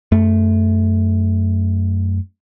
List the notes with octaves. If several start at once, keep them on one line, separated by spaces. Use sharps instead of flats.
F#2 A3